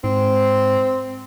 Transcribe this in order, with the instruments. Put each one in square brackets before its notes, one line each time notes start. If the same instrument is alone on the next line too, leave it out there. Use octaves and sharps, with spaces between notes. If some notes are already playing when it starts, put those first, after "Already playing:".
[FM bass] G#2 [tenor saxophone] C4